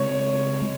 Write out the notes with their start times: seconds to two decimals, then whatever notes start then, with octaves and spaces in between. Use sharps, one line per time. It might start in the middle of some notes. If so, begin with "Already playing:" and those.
Already playing: C#3 G#3 C4 C#5
0.62 G#3